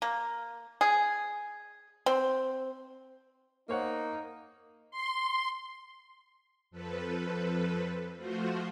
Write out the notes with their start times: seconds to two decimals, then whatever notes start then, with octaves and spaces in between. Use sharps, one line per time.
0.02 A#3
0.81 G#4
2.06 C4
3.69 A#3 D#4 C5 C#5 F#5
4.91 C6
6.71 F2 F3 A4 B4
8.17 F3 A3 F4 F#4 C5